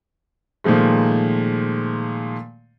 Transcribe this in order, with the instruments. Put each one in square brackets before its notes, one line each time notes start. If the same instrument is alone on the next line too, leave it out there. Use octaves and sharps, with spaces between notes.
[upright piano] A#2 D#3 F3 G#3 A3